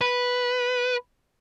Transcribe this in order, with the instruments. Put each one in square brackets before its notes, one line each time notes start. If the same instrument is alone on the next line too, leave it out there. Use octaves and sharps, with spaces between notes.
[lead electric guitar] B4